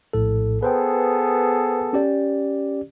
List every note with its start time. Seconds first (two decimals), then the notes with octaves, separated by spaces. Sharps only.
0.13 A#1 A2 A4
0.63 B3 G#4 A4 B4 C5 G5
1.93 C#4 G4 D5